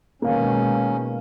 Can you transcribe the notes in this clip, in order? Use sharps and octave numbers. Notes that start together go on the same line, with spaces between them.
B2 D#3 G#3 A#3 C#4 F5